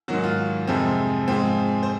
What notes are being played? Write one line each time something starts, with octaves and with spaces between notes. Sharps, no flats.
G#2 D#3 F#3 F#4
F4
F2 C3 F3 G#3 C4
G#2 F3 G#3 C4
C5